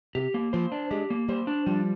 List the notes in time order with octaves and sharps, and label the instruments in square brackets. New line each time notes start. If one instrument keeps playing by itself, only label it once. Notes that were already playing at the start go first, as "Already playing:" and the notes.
[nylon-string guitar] C3 [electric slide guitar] G4
[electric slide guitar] A#3
[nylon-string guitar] F3 [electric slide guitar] C5
[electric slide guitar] D4
[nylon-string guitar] G#3 [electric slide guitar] G4
[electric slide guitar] A#3
[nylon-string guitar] G3 [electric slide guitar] C5
[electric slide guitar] D4
[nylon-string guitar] F3 [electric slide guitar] G3